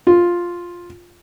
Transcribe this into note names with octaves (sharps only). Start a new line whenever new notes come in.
F4